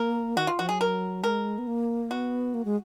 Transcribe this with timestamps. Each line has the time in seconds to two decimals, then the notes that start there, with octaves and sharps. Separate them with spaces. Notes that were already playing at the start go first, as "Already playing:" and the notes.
Already playing: A#3 A#4
0.37 D#3 F#4
0.47 F4
0.59 F3 F#4
0.69 F#3 G#4
0.81 A#4
1.23 G#3 A#4
1.58 B3
1.67 A#3
2.11 B3 F#4
2.54 A#3
2.65 G#3